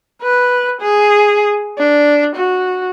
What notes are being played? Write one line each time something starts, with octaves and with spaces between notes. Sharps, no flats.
B4
G#4
D4
F#4